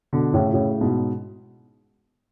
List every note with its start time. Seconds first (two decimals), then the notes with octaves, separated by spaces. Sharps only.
0.13 B2 D3
0.34 A2 C#3
0.53 A2 C#3
0.81 G#2 B2